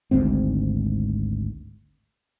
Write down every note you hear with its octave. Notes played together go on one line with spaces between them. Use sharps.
G#1 D2 G#2 C4